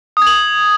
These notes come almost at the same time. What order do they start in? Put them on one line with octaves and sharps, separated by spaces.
D#6 G#6 F#7